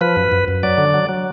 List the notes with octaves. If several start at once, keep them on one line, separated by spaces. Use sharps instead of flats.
F3 B4
F#2
F#2
F#2
F#3 D5
D3
F#3
F#3